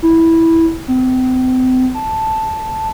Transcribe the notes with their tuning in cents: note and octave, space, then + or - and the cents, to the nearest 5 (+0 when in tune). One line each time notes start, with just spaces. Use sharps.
E4 -10
C4 -35
A5 +0